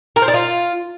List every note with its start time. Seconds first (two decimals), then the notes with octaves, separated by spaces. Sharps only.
0.16 A#4
0.22 C5
0.28 D5
0.34 F4